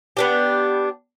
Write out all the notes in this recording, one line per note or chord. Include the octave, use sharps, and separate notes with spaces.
B3 D4 G4